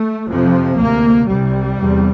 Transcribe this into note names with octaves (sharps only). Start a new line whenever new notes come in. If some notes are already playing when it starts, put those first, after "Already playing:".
Already playing: A3
F2 C3 F3
D2 C3 A#3
C2 C3 G3
E2 C3